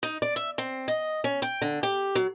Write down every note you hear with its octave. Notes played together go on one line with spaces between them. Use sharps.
D#4
D5
E5
C4
D#5
C#4
G5
D3
G4
F#3